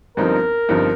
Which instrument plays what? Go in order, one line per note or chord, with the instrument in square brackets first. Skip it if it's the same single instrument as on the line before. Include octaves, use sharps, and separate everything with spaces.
[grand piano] G1 G2 F3 C4 D#4 [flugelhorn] A#4
[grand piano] G1 G2 F3 C4 D#4